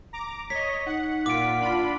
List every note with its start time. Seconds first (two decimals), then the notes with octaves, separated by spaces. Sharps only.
0.13 A#5 D6
0.50 C#5 D#5 B6
0.86 D#4 F#5
1.26 A#2 F4 F#5 D6 B6 D7
1.60 D4 F4 B5